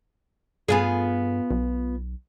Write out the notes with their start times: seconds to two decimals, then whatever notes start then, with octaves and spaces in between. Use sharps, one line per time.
0.68 G2 B3 F4 G#4
1.51 B1